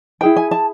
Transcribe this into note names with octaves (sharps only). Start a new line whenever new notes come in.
E4 G#4 B4 G5
G#5
A5